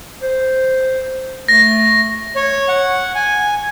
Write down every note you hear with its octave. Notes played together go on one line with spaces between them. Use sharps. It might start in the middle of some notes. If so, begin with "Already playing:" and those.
C5
A3 A#6
C#5
F#5
G#5